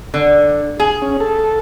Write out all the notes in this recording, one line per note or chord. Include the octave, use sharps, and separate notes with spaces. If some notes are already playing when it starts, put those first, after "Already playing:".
D3
G#4
C#4
A4